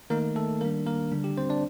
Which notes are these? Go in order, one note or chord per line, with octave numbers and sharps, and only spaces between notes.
D#3 A3 A#3 D#4 A#4
A3 A4
D#3 G3 A#3 D4 A#4
A#3 A#4
D3 G3 D4
G4
C4 C5
D4 D5